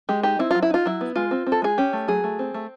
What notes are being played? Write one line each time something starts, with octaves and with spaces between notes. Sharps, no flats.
G#3 G4
D#4 G4
C4 E4
F#3 F4
E4
D#4 F4
F#3 E4
B3
G#3 F4
C4
C4
A4
G#3 G#4
C#4 G4
A3
F#3 G#4
A3
C4
A3